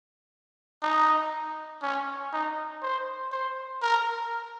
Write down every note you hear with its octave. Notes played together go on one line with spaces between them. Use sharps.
D#4
C#4
D#4
C5
C5
A#4